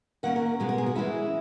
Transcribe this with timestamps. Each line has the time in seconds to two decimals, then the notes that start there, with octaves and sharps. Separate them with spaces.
0.23 D#3 A#3 C#4 F#5
0.36 A#4
0.60 B2 G#3 B3 F#4
0.69 A#4
0.78 G#4
0.86 F#4
0.95 E3 G#3 C#4 E4